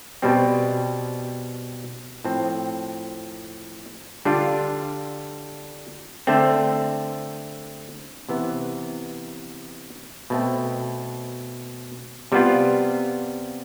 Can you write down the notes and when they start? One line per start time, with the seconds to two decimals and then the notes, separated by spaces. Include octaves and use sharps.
0.22 B2 G3 C4
2.25 A2 F3 C4
4.25 D3 G3 D4 F4
6.27 D3 A3 C4
8.29 C3 E3 B3
10.30 B2 A3 C4
12.32 C3 G3 B3 F4